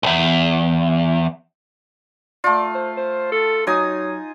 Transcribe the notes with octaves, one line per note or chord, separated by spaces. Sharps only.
B1 E2
A3 F4 D5
C5
C5
A4
F#3 D#4 G#5 D#6